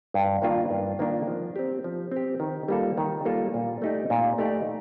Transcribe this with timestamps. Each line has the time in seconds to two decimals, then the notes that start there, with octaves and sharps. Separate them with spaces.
0.14 G2
0.42 D#3 A#3 D4 F4
0.70 G2
0.99 D#3 A#3 D4 F4
1.27 F3
1.56 C4 G4
1.84 F3
2.11 C4 G4
2.40 D#3
2.68 G3 A#3 F4 A4
2.98 D#3
3.25 G3 A#3 F4 A4
3.54 A#2
3.82 A3 D#4 G4 D5
4.10 A#2
4.38 A3 D#4 G4 D5